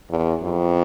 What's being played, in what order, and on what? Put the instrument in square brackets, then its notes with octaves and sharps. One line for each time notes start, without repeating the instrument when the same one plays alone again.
[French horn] E2
F2